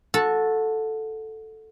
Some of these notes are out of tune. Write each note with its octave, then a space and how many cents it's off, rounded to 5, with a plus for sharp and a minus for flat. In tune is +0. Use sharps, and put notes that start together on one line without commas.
F#4 -25 A4 +0